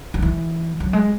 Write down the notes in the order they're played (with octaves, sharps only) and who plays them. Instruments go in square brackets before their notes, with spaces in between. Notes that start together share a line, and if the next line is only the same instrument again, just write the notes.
[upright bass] F#3
E3
F#3
G#3